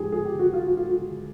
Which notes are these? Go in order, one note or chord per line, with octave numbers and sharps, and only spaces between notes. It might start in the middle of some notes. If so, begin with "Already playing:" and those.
Already playing: G#2 F3 G4 G#4
G#4
G4
F#4
F4
F#4
F4
F#4